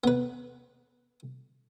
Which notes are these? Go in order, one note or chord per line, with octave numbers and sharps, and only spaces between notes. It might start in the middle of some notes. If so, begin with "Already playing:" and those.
B3 B4